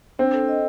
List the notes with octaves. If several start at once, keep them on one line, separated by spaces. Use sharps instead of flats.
C4 D4
A4
D#5